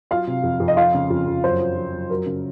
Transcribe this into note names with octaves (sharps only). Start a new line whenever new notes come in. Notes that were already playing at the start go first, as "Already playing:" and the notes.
F#3 F4 F5
C3
F2
F2
D#5
F3 F4 F5
C#3
F2
F2
F#2 C5
F3
F3
F#2
F#3 A#4
C#3